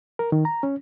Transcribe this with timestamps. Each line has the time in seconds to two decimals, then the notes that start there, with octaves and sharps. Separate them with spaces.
0.19 A#4
0.32 D#3
0.45 A#5
0.63 C#4